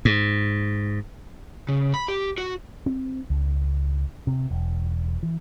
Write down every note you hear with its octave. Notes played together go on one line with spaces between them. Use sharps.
G#2
C#3
B5
G4
F#4
C4
C#2
C3
E1
E3